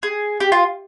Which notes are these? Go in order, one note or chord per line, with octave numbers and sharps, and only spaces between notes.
G#4
G4
F4